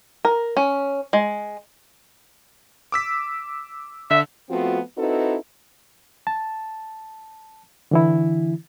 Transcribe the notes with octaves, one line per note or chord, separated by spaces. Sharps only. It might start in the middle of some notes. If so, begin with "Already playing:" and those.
A#4
C#4
G#3
D6 E6 B6
D3 E5
F3 A3 B3 C4 F4 F#4
C4 D#4 E4 F#4 A4 B4
A5
D3 E3 E4